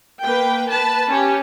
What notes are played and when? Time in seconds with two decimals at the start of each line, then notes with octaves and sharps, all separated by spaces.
0.23 A#3 B4 G5
0.70 B4 A5
1.09 C#4 G4